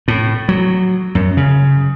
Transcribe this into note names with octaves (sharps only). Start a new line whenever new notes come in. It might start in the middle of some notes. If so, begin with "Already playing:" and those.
A2
F#3
F#2
C#3